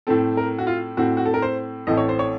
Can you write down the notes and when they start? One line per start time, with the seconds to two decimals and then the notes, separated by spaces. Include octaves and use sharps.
0.07 A2 A3 C4 A4
0.37 A#4
0.59 F#4
0.67 F4
0.97 A2 A3 C4 F#4
1.17 F#4
1.25 A4
1.34 A#4
1.42 C5
1.87 A1 A2 A3 C4 D#5
1.97 C#5
2.09 C5
2.19 C#5